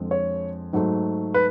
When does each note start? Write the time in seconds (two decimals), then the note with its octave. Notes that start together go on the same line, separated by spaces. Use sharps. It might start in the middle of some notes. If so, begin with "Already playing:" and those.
Already playing: F2 D3 G#3
0.11 C#5
0.73 G#2 F#3 A3
1.34 B4